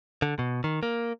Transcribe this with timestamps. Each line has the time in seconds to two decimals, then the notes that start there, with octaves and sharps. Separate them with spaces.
0.22 D3
0.39 B2
0.64 D#3
0.83 A#3